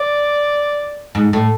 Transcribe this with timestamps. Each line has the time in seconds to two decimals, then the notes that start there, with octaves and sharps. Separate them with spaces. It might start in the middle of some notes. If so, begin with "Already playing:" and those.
Already playing: D5
1.15 G#2
1.33 A2